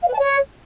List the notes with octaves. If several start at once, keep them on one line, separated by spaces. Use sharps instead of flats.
F5
B4
A5
C#5